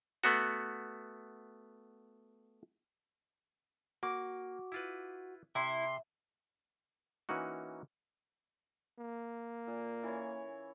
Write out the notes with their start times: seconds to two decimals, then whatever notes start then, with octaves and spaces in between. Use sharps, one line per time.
0.24 A3 B3 F#4
4.03 A#3 F#4 D6
4.72 E4 F4 B4
5.55 C3 E4 C6
7.29 E3 A#3 C#4 D#4 F#4
8.99 A#3
9.67 A#2
10.03 E3 C#4 C#5